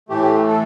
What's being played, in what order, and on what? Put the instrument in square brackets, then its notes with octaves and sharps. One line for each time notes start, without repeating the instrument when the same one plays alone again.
[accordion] A2 E3 A3 G4
A4